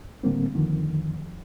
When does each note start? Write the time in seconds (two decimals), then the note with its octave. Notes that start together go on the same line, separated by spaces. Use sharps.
0.23 A2 D3 G3 A#3 C4
0.54 F2 D3 D#3 F3